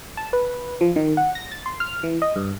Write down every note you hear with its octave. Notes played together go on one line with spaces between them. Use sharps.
A5
B4
F3
D#3
F#5
A#6
A6
C6
F6
E3
D#5
G2